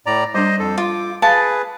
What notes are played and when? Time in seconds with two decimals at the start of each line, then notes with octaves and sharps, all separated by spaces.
0.06 A2 D5 A#5
0.35 G3 D4 C5 D#5
0.60 F2 A4
0.78 F4 D6
1.22 G#4 B4 F5 A5